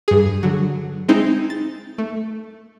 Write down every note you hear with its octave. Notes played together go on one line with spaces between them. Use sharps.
G2 G#4
D3 F#3
G#3 C4 D#4 E4
A6
A3